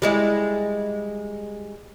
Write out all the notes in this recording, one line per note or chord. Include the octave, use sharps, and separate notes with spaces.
G3 G#3 E4